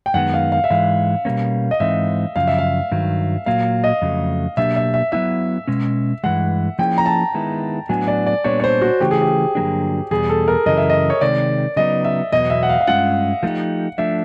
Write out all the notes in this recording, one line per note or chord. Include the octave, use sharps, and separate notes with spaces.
G5
F#2 D#3 G#3 B3 F#5
F5
F5
E5
G#2 E3 G#3 F5
B2 G3 A#3 C#4
D#5
G#2 E3 G#3 C4 D#4 E5
F#2 C#3 F3 F5
E5
F5
G2 D#3 F#3
A#2 F#3 A#3 F5
D#5
F2 C#3 F#3 A3
B2 F#3 A#3 D4 G4 E5
E5
E5
F#3 B3 E4 E5
B2 G#3 C#4
G2 E3 G#3 F#5
F3 A#3 C#4 E4 G#4 G5
A#5
A5
D#3 G#3 B3 E4
A2 F#3 B3 D4 F#4 G#5
D5
D5
A#2 G3 B3 D4 C#5
C#5
C5
F#4
C#3 E3 A3 G4
G#4
G4
G2 D3 F#3 A#3 D4
E2 B2 G3 G#4
A4
A#4
F#2 C#3 E3 D#5
E5
D#5
C#5
C3 D#3 G#3 D5
C#3 F#3 B3 D#4 D#5
E5
E2 B2 F#3 B3 D#5
E5
F#5
F5
F5
G2 D#3 G#3 C#4 F4 F#5
F3 A3 C4 D#4 G4
F3 A3 D4 E5